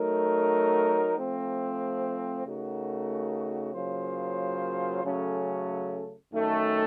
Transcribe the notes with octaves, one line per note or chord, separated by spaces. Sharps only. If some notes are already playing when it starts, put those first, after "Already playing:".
Already playing: F#3 A3 D#4 A#4
F3 A3 C4
C#3 A3 D#4 F#4 A#4
C#3 F#3 A#3 F4 C5
C#3 F#3 A3 C#4 A4
F#2 D#3 A3